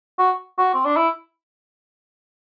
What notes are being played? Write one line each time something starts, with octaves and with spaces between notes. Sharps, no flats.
F#4
F#4
C4
D4
E4